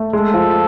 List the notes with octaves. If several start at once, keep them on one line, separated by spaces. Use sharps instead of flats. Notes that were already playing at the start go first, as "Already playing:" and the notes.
Already playing: A3
G#3 A4
F3